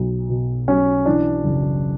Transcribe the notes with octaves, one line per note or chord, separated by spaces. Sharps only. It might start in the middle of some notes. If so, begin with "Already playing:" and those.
Already playing: B1
B2
B1 C#4
E3 D4
F#1